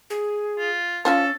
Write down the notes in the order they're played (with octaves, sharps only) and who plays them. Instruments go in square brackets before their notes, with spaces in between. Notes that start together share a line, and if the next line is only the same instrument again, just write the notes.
[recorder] G#4
[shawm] F4
[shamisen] F3 F4 C5 [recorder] C#4 [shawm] A4